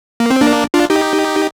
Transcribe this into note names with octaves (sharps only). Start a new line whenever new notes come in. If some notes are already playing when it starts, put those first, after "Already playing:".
A#3
C4
A#3 D4
D4 F4
D#4 G4